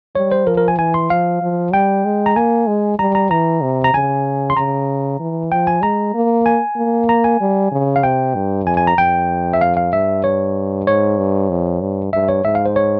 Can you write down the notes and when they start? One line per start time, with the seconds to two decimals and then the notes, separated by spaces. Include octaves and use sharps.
0.15 G3 C#5
0.32 C5
0.47 F3 A#4
0.57 A#4
0.68 G#5
0.78 E3 G#5
0.94 C6
1.10 F3 F5
1.42 F3
1.73 G3 G5
2.05 G#3
2.26 A#5
2.36 A#3 G#5
2.68 G#3
2.99 G3 A#5
3.15 A#5
3.31 E3 A#5
3.63 C3
3.84 A#5
3.94 C#3 G#5
4.50 C6
4.57 C#3 A#5
5.20 E3
5.52 F3 G5
5.67 G#5
5.82 G#3 A#5
6.15 A#3
6.46 G#5
6.77 A#3
7.09 A#5
7.24 G#5
7.41 G3
7.72 C#3
7.96 F5
8.03 C3 G5
8.35 G2
8.66 F2 G#5
8.77 G#5
8.87 A#5
8.98 F2 G5
9.54 E5
9.61 F5
9.77 F5
9.93 G2 E5
10.24 C#5
10.87 G#2 C#5
11.18 G2
11.50 F2
11.81 G2
12.13 G2 E5
12.29 C#5
12.45 G#2 E5
12.55 F5
12.66 C5
12.76 C#5